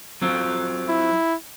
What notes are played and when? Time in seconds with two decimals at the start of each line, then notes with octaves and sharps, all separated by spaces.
0.22 F#3 C4 F4
0.89 E4